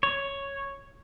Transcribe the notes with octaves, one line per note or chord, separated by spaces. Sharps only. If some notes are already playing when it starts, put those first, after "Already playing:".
C#5